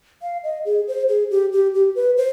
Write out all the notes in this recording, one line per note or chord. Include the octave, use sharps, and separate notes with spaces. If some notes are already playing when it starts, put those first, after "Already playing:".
F5
D#5
G#4
C5
G#4
G4
G4
G4
B4
C5